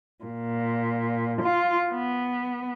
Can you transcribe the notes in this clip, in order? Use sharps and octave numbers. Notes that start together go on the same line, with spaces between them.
A#2
F4
B3